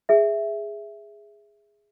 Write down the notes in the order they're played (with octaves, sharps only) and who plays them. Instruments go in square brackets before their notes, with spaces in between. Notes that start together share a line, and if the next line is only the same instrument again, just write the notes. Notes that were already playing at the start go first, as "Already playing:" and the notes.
[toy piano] G#4 E5